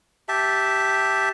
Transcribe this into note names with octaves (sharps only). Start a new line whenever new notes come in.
G4 E5 A5